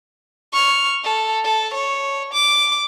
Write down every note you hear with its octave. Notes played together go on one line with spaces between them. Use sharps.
C#6 F6
A4
A4
C#5
D6